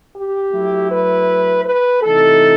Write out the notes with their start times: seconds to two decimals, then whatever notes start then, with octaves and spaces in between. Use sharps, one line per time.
0.15 G4
0.52 F#3 A3 E4
0.90 B4
1.65 B4
2.03 C3 E3 A3 D#4 A4